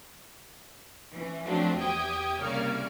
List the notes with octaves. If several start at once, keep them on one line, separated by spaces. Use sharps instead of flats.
E3 C#4
F3 F#3 A3 C4 D4
E2 G4 G5 D#6 G#6
C2 C#3 A#3 C#5 D5 F6